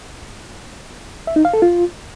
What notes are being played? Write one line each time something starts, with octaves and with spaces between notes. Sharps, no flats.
E5
D#4
F5
A4
F4